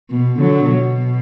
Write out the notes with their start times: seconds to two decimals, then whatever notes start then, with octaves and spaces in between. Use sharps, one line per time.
0.10 B2
0.39 D3 F#3
0.67 B2